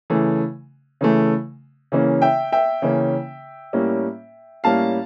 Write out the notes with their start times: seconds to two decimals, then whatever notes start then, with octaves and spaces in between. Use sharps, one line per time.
0.10 C#3 E3 A3
1.01 C#3 E3 A3
1.92 C#3 E3 A#3 C#4
2.22 E5 G5
2.52 E5 G5
2.82 C#3 E3 A#3 C#4
3.73 A2 G3 A#3 C#4
4.64 A2 G3 A#3 C#4 F5 A5